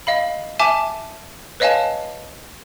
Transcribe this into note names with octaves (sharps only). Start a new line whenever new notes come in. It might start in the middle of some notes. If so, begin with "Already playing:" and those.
D#5 F5 B5
E5 G#5 A5 D6
B4 C#5 D#5 F5 G#5 A5